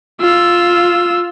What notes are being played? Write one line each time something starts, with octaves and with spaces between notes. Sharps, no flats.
F4 E6